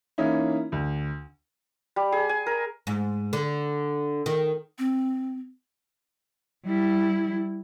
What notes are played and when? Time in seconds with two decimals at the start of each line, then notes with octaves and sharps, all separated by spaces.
0.18 E3 A#3 C#4 D#4 E4
0.72 D2
1.96 G3
2.12 G#4
2.29 G#5
2.46 A#4
2.87 G#2
3.33 D3
4.26 D#3
4.79 C4
6.66 G3 E4